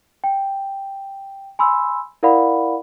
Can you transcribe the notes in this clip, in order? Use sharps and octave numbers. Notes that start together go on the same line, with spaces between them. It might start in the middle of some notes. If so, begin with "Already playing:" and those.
G5
G#5 B5 C6 E6
E4 A#4 D5 F5 F#5 B5